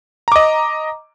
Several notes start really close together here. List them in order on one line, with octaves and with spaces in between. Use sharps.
A#5 D6 D#5